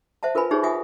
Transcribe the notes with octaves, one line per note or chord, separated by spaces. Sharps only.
C5 E5 F#5 A5
F4 A#4 B4 G#5 B5
D#4 G4 G#4 C5 C#5
F4 E5 F#5 G#5 D#6